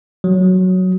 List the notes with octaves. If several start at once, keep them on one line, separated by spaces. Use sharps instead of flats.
F#3